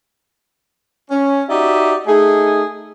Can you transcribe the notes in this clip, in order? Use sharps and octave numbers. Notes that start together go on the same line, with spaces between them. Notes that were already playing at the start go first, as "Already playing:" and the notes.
C#4
D#4 F#4 G4 D5 E5
A3 D#4 G#4